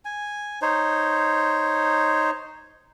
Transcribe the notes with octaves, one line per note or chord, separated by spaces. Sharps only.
G#5
D#4 C5 C#5